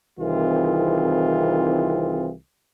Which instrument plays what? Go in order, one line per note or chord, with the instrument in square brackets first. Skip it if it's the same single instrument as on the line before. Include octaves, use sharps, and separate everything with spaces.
[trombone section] C2 D#3 E3 C4 F4 G#4